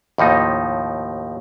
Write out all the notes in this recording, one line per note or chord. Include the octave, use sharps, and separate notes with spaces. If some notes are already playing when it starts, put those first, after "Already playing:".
D#2 A2 F3 D#4